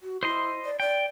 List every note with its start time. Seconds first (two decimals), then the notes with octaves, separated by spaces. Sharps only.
0.01 F#4
0.23 E4 C5 D#5 C6
0.65 D5
0.80 D5 G5